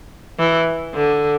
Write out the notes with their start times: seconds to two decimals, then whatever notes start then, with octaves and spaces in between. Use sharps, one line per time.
0.39 E3
0.94 D3